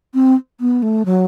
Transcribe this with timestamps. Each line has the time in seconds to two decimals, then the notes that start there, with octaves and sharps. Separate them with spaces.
0.14 C4
0.61 B3
0.82 A3
1.06 F#3